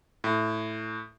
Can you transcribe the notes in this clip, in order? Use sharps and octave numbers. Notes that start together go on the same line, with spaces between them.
A2